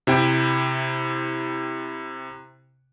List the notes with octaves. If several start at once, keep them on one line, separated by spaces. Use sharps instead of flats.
C3 E4 G5